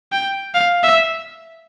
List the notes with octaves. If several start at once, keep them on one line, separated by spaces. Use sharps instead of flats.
G5
F5
E5